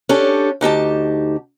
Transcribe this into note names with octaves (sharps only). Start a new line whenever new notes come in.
C#4 D4 G4 A4
D2 D#4 G4 A5